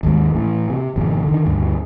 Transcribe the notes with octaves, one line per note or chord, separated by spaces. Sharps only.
G#1 D#2 D3 G#3
A2 E3
C3
G#1 F2 B2
D3 D#3
D2 G2 D3